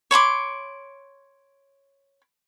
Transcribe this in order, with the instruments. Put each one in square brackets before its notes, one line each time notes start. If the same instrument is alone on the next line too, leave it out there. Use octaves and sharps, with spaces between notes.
[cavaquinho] C#5 B5 C6 D6